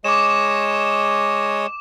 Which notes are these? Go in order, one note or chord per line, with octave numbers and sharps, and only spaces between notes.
G#3 C#5 D#5 D6 E7